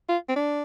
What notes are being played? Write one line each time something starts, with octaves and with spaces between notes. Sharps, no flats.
F4
C4
D4